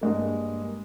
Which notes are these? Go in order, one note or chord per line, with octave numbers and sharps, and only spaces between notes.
G2 G#3 A#3